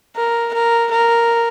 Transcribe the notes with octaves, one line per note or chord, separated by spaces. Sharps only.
A#4
A#4
A#4